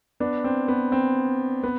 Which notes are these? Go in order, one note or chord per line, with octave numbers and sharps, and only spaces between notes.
B3 D4
C4
B3
C4
B3